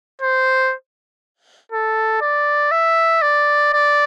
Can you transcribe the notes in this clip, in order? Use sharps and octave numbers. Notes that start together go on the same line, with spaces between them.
C5
A4
D5
E5
D5
D5